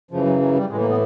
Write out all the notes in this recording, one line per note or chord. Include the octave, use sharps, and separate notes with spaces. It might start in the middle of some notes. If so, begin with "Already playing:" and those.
F#2 C#3 E3 F3
F#3
F#3
G3
A2 E3 G#3
A#3
B3